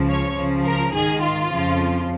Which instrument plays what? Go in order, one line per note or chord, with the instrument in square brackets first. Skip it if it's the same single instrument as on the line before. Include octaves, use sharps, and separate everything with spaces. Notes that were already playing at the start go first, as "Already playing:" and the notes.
Already playing: [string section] C#2 C#3 F3
C#5
C#2 C#3 F3
A#4
G#2 D#3 G#4
F4
F2 C#3 F3